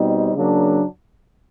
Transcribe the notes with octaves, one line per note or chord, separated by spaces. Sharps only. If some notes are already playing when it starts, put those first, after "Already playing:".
Already playing: B2 G3 C4 D#4
C#3 F#3 A#3 D4